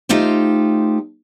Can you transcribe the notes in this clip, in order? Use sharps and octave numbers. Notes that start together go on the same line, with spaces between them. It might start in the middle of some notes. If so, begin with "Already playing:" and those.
A3 D#4 F4 G4 C5